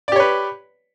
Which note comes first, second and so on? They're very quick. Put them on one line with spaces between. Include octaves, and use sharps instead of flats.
D5 G4 C#5 B4